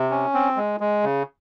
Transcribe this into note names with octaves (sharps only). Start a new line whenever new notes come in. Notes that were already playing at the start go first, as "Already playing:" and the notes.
Already playing: C3
C#4
C4
G#3
G#3
C#3